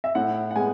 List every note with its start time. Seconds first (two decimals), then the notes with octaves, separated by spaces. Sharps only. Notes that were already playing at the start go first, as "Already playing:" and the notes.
0.04 E5
0.15 A2 F#5
0.51 F#5
0.56 G#3 B3 G#5